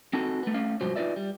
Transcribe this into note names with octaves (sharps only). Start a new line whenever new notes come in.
C4 D#4 F#4 A4
A3 B3
A3 C#4 F5
C2 G#2 F3 F#3 C5
D#4 F4 F#4 B4 D5 E5
G3